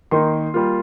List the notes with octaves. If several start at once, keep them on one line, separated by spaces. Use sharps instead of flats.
D#3 A#3 D#4 C6
G3 A#3 F4